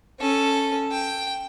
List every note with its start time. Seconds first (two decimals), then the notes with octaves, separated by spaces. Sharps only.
0.20 C#4 A4
0.91 G5